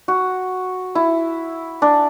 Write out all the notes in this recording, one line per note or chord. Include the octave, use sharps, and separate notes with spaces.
F#4
E4
D4